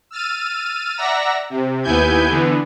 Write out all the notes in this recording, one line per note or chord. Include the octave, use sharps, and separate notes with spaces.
E6 F6 A6 D#7
D5 E5 F#5 A#5 E6 A#6
C3
D#2 B3 E4 G#5 G6 G#6
D3 E3 B3